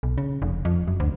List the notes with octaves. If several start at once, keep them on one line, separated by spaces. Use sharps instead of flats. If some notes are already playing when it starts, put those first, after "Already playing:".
B1
C#3
F1
F2
F#2
D2